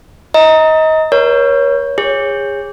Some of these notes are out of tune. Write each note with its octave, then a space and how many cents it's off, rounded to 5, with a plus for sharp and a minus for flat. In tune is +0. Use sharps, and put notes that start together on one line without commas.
D#5 +25 A#5 +0
A#4 +45 C#5 +5
G#4 -30 C#5 -10